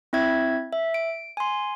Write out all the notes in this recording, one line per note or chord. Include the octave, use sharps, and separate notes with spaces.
C4 E4 E5 G#6
E5
D7
G#5 C6